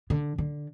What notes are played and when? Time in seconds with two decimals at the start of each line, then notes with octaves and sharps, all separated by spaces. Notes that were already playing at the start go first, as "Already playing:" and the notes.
0.10 D3
0.38 D3